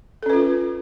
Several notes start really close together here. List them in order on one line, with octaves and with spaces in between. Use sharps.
A4 C#4 B4 F4